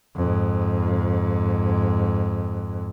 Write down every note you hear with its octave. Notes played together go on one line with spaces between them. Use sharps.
F2 G#2